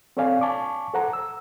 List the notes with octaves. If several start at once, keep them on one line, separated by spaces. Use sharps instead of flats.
C4 A4 C#5 D5 F5 G#5
G#5 A5 C#6 D6
A4 C5 F#5 A#5
E6